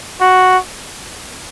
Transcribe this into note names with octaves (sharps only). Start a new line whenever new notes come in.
F#4